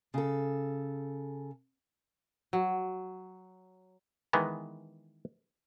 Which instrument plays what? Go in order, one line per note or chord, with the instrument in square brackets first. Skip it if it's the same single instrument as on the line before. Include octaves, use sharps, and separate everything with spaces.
[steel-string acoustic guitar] C#3 A4
[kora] F#3
[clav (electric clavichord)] D#3 E3 G#3 B3